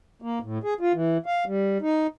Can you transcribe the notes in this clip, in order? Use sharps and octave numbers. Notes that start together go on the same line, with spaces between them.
A#3
A2
G#4
F4
E3
F5
G3
D#4